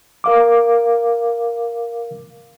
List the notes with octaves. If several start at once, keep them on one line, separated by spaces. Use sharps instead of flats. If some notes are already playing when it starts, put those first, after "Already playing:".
A#4 F5 D6